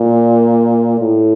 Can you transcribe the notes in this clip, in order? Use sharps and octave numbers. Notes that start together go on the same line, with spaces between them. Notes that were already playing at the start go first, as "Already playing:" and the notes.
Already playing: A#2
A2